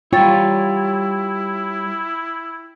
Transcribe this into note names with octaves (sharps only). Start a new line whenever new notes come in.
G3 E4 F4 C#5 G5 A6